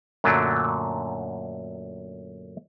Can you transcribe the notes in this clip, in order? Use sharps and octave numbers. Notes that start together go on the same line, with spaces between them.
F#2 A#2 D3 F#3 A3 D4